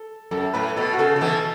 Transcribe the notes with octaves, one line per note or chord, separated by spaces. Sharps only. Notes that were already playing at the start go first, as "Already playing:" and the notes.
Already playing: A4
F#2 A4
A2 B4
B2 A4
F#4
C#3 A4
C#3
B2 E3 A4